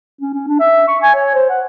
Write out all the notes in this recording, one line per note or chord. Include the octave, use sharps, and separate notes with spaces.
C#4
C#4
D4
E5
C#6
G#5
C#5
C5
F#5